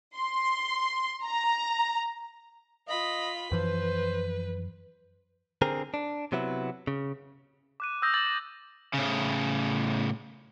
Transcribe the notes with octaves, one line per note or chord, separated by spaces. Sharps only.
C6
A#5
F4 D#5 B5
F#2 E3 F3 B4 C5
D3 C4 G#4 A#4
D4
C3 F#3 B3 E4
C#3
D6 F#6 D#7
D#6 E6 G6 A#6
D6 A6 F#7
A#6
A2 C#3